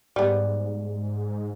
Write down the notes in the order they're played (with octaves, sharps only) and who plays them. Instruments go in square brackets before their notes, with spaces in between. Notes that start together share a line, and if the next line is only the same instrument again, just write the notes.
[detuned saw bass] G#2 [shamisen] G3 B3